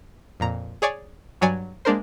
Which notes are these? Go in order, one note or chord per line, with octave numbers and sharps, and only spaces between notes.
F2 A#2 A#5
G#4 C#5 D5 G#5
G2 F#3 C#5 D5 G#5
G#3 A#3 D4 A#4 C5